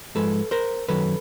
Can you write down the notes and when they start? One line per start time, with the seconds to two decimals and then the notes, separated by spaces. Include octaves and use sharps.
0.15 G#2 F3 G#3 A4 B4
0.51 A#4 C5
0.89 F#2 D#3 F#3 A4 B4